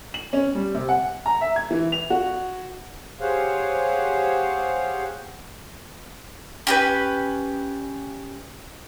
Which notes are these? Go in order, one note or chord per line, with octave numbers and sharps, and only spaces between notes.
F#7
C#4
G3
C3
F#5
A#5
E5
G#6
E3
F7
F#4
G4 G#4 C5 C#5 F5 F#5
C#4 G4 B4